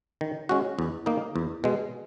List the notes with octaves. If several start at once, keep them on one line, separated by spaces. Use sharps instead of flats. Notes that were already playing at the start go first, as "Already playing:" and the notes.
D#3
G#3 C#4 F#4
E2
D#3 A#3 D#4
E2
B2 G#3